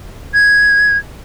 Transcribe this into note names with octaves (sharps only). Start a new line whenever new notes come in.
G#6